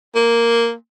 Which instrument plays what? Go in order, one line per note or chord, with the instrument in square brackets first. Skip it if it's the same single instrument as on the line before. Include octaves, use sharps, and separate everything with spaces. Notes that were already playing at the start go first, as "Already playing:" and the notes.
[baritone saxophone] A#3